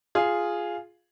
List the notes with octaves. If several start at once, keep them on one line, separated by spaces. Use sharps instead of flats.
F4 G#4